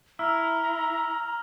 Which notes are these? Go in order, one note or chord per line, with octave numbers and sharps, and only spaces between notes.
E4 A#5 E6 F6